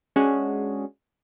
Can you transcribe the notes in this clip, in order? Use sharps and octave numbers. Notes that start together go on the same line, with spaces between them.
G#3 C#4 D4 F#4 G#4